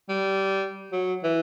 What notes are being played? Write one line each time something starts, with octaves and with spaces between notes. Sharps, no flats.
G3
F#3
E3